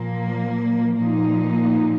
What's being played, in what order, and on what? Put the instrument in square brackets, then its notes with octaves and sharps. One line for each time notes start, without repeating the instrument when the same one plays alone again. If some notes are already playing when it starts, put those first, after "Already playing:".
Already playing: [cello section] A#2 F3 A#3
A#2 F3 A#3 D#4